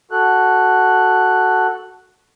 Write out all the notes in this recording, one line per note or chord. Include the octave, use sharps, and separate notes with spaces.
F#4 A4 F#6